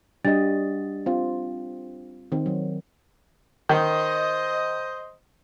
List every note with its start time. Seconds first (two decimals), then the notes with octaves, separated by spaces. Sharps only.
0.25 G3 D4 F#4 D#5 A6
1.06 C4 F4
2.32 D#3 C4
2.46 F#3
3.69 D#3 C5 D#5